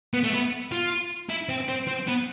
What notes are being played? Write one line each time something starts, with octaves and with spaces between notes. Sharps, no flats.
B3
A3
B3
F4
E4
C4
C4
C4
B3